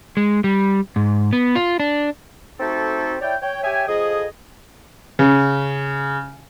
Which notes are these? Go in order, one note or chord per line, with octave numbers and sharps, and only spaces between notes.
G#3
G3
G#2
B3
F4
D4
A3 C4 D#4 F#4 G4 A4
E4 C#5 D5 G5
C#5 G5
G4 C#5 E5 G5 G#5
F2 G#4 D#5
C#3